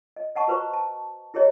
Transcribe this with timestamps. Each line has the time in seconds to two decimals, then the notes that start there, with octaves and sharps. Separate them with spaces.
0.16 D#5
0.36 D#5 F#5 A5 C#6
0.48 F#4 B4 C5 A#5 C#6
0.74 A5
1.34 E4 G4 G#4 C#5 D#5